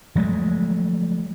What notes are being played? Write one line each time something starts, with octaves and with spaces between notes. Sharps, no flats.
F3 F#3 G#3 A3